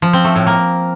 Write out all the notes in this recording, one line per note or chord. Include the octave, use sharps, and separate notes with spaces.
F3
C4
A3
A2
A#3